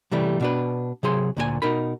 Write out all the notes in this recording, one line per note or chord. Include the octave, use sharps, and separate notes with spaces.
C3 E3 G3 A3
B2 D4 B4
C3 F#3 G#4 C6
D2 A#2 G4 G#5
B2 D#4 A#4 B5